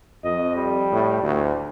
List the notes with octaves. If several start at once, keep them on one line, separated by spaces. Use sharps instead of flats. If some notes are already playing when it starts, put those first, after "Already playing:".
F2 D#5
G3
A2
D2